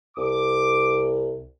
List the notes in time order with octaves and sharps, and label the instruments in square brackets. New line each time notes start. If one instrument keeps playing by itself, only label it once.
[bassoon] C2 [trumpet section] D6